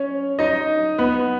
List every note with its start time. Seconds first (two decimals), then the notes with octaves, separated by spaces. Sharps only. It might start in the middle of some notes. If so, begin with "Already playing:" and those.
Already playing: C#4 C#5
0.39 D#4 D#5
0.98 B3 B4